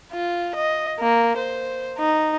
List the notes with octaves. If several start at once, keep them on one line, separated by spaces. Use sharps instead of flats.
F4
D#5
A#3
C5
D#4